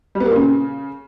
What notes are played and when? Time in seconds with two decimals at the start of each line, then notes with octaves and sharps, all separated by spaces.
0.15 G3
0.20 B3
0.26 A#3
0.31 A#2
0.36 C#3